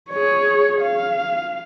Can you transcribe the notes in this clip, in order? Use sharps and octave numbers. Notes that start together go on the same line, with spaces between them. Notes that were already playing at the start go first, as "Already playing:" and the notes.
G#4 C#5
F5